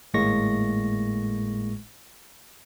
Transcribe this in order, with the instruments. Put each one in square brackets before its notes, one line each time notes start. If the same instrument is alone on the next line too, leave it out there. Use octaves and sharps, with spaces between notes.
[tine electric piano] G#1 A2 G#3 A#3 C#6 A#6